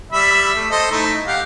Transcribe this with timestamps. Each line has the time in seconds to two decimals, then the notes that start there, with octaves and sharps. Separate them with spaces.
0.12 G3 E5 B5
0.55 A3
0.71 A4 C5 D#5
0.91 A3 D#4 E4
1.26 G4 F5 F#5